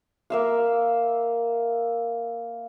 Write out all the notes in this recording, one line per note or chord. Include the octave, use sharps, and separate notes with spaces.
A#3 E5 F5